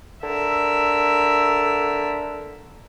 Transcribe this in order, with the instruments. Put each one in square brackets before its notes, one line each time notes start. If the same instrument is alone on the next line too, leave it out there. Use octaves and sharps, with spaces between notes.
[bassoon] D3 [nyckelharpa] A#4 E5